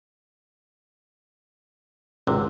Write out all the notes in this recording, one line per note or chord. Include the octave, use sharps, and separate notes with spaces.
G#1 C#2 G#2 C3